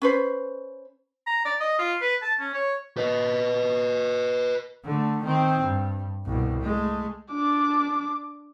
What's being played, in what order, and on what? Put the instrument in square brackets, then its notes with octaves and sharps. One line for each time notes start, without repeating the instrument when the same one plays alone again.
[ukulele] C#4 B4 C5
[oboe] A#5
D5
D#5
F4
B4
A5
C#4
C#5
[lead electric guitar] B4 D#5
[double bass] D3 A3
D#3 C4
G2
C2 B2
G#3 A3
[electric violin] D4 D6